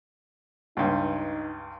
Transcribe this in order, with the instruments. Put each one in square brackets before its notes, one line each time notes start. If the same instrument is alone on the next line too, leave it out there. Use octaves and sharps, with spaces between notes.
[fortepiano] C#2 G2 [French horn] D#4